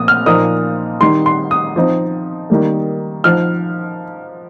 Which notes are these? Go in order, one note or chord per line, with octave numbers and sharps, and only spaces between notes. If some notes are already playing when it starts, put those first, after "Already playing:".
Already playing: A#2 F3 A#3 D#6
F6
A#2 F3 A#3 D#4 D#6
D#3 G3 D#4 C6
C6
D#6
F3 C4 D#4
D#3 G3 A#3
F3 D#4 F6